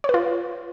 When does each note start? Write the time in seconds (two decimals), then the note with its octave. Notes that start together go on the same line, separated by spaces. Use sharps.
0.04 C#5
0.09 B4
0.14 F4